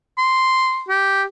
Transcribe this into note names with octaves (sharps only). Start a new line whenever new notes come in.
C6
G4